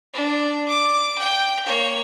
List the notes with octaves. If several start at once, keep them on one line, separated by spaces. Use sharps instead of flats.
D4
D6
G5
A#3 C#5